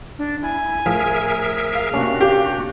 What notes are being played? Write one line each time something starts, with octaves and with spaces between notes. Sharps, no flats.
D4
E4 G#5
A2 F3 G#4 A#4 E5
F5
C3 A#3 C#4 D4 F#4
G4